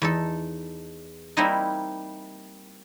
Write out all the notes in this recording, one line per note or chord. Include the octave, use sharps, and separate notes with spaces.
E2 D#4 A4
G3 A#3 C4 D#4 E4 D#5